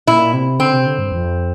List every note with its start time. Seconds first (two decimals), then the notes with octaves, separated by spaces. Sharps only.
0.07 A#2 E4
0.33 C3
0.60 D3 C4
0.74 C3
0.86 D3
0.99 G2
1.12 F2